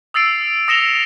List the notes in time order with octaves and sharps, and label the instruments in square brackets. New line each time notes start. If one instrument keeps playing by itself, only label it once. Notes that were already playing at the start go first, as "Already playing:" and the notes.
[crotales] D#6 E6 A6 C7 D7
D#6 A#6 C#7 E7 F7 G7